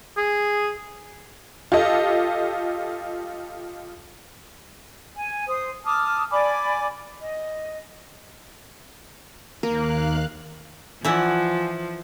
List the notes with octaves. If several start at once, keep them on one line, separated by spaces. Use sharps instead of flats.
G#4
F4 G4 A4 D#5
G#5
C5 D#6
A5 D6 D#6 F6
D5 G#5 B5 D6
D#5
D#2 A#3 A#4 F5 F#6
E3 F3 E4 D5 F#5 G#5